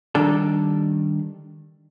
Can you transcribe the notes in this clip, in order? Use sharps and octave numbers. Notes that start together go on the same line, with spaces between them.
D#3 G3 D4 A4